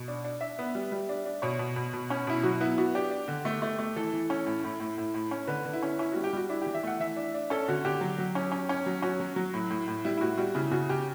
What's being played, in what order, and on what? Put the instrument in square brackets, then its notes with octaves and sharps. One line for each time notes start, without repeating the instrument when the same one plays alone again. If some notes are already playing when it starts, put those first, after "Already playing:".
Already playing: [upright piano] B2
D4
D4
D4 E5
B3
G3
G3
D4
D4
B2 C#5
B2
B2
B2
C#4
B2 E4
F#3 F#4
B3 E4
B3 F#4
D4 G4
D4
D3
A3
A3
A3
E3 A4
E3
C#4
A2
A2
A2
A2
A2
C#4
D3 B4
D3
E4
C#4
C#4 E4
G3 F#4
G4
G3 F#4
D4 E4
E3 G4
E5
A3 F#5
E3 E5
D4
D4
C#4 A4
D3 F#4
D3 G4
F#3
F#3
C#4
C#4
C#4
F#3
C#4 F#4
F#3
F#3
A2
A2
A2
G3 E4
E4
A2 F#4
G3 F#4
C#3 E4
C#3 F#4
C#3 G4